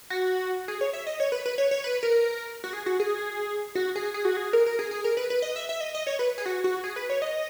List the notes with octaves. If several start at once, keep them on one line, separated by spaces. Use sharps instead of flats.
F#4
G#4
C#5
E5
D#5
C#5
B4
B4
C#5
C#5
B4
A#4
F#4
G#4
F#4
G#4
F#4
G#4
G#4
F#4
G#4
A#4
A#4
G#4
G#4
A#4
B4
B4
D#5
E5
E5
D#5
D#5
C#5
B4
G#4
F#4
F#4
G#4
B4
C#5
D#5